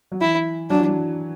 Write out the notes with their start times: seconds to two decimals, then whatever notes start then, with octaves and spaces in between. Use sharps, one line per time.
0.12 F#3
0.21 E3 E4
0.70 F#3 D4
0.79 E3
0.89 F#3